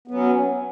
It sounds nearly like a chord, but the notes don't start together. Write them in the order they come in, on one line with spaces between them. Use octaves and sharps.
B3 F#3 C#4